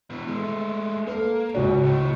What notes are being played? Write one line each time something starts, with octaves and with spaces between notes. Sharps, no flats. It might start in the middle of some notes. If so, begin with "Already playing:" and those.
B2 E3
G#3 A3
A#3 A4 B4
C#2 G#2 F#4 C#5
B1 A2